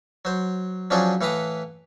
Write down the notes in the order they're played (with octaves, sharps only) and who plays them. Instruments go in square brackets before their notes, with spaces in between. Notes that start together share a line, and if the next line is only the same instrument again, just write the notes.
[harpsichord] F#3 C5
F3 F#3 C#4 D4 G#4 C5
A2 E3 F5 F#5 B5 D#6